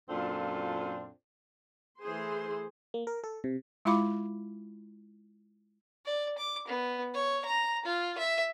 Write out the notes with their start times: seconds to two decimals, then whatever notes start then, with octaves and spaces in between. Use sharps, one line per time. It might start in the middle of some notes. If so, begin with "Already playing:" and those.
0.08 F#2 A#2 C4 D4 F4 A4
2.00 E3 A3 G#4 C5 C6
2.94 A#3
3.07 A#4
3.24 A4
3.44 C3
3.85 G#3 E4 F4 F5 B5 D6
6.06 D5
6.38 D6
6.68 B3
7.14 C#5
7.45 A#5
7.85 F4
8.18 E5